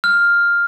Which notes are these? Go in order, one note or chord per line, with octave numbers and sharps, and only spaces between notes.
F6